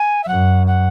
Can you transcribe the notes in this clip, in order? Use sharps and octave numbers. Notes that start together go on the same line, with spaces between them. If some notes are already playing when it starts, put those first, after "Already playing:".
Already playing: G#5
E5
F#2 F#5
F#5